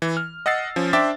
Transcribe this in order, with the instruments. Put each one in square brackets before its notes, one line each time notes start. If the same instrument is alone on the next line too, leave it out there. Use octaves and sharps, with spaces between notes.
[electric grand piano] E3
F6
D#5 F#5 E6 A6 C7
F3 C#4
D4 C5 E5 G5 D6 A6